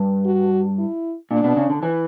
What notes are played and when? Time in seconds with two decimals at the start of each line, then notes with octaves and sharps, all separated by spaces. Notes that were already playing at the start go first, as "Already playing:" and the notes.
Already playing: G2
0.26 F#4
0.79 E4
1.31 A#2 D4
1.44 B2
1.57 C#3
1.70 D3
1.83 E3